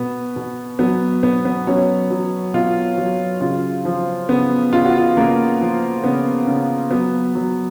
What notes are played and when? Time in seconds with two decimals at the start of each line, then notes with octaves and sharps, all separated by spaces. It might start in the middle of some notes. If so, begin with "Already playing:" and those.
Already playing: B2 B3
0.36 B2
0.79 F#3 B3
1.23 B2 B3
1.45 B3
1.67 F#3 C#4
2.10 F#3
2.54 B2 F4
2.98 F#3
3.41 C#3 F4
3.85 F3
4.29 C#3 B3
4.73 C#3 F4
4.85 F#4
4.98 F4
5.17 C#3 A#3
5.61 F3
6.04 C#3 B3
6.47 C#3
6.91 F#3 B3
7.35 F#3